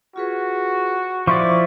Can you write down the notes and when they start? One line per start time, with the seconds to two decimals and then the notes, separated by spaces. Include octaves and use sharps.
0.16 F4 F#4 G#4 B4
1.27 F3 E4 C5 D5 C6 C#6